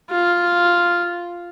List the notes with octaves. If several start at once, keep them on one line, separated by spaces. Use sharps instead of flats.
F4